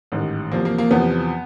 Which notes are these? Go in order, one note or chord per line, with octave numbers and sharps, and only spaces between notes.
A1 G#2 D#3 G3
E2 C3 F3 A#3
A#3
A#3
E2 C3 F3 B3